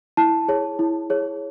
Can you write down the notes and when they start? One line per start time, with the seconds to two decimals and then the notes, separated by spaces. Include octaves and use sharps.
0.17 E4 A5
0.48 G#4 C#5
0.79 E4
1.10 G#4 C#5